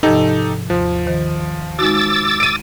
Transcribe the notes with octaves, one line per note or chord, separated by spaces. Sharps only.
G#2 C3 F3 D#4 G4 A4
D#2 F3
D#3 C5
G#3 D#4 F#4 D6 E6 A6
D7 D#7